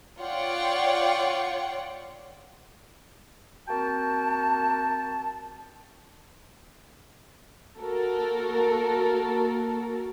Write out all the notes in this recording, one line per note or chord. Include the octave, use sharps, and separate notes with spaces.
F4 C#5 D5 F#5 G5
A#3 C4 F#4 G5 A5
A#3 F#4 A4 A#4